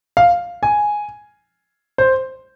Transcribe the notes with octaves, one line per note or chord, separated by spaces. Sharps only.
F5
G#5
C5